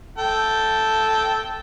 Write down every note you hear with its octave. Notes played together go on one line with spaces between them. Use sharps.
A4 G5 A5